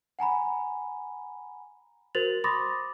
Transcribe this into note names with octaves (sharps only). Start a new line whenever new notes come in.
F#5 G#5 A#5 B5
F#4 A#4 C5 A6 F7 F#7
B5 C6 D6 D#6 A6 A#6